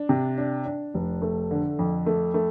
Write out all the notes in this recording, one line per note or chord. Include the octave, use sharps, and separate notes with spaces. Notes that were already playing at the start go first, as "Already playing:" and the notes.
Already playing: D4
C3
D4
D4
F1
A3
D3
F2
A3
A3